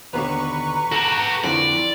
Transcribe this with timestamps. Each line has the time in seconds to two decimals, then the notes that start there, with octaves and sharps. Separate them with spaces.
0.13 D#2 B2 D3 B4 A#5 C#6
0.92 F#4 G4 A4
1.44 F2 D3 E4 A4 D5